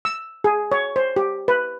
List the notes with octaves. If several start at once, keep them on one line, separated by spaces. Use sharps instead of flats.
E6
G#4
C#5
C5
G4
B4